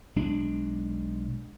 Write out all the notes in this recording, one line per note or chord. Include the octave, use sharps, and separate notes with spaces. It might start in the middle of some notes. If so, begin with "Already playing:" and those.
B1 G#3 D4